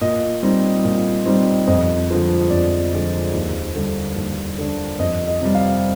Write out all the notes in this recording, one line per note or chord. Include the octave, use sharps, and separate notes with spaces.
A#2 D#5
G3 C4 D#4
A#2
G3 C4 D#4
F2 D#5
D3 F3 G#3
F2 D5
D3 F3 G#3
D#2
D3 G3 D4
D#2
D3 G3 D4
F2 D#5
D#5
C3 G3
F5